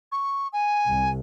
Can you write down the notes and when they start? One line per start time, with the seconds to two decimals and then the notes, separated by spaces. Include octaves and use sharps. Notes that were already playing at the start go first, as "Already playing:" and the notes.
0.12 C#6
0.53 G#5
0.87 C2